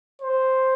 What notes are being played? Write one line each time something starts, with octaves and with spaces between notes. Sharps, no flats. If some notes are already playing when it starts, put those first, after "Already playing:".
C5